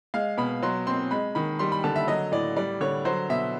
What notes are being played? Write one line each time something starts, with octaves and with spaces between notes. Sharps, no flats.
G#3 F5
B2 B5
F#3 C6
C4 C6
G#3 B5
D#3 B5
G3 C6
B5
D3 A5
E5
F#3 D#5
A2 D5
G3 D5
D3 C#5
F#3 C5
B2 E5